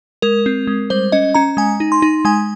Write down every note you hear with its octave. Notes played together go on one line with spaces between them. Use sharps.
G#3 A#4
C4
G#3
G3 C5
C#4 D#5
C#4 A#5
G#3 G#5
D#4
C6
D#4
G#3 G#5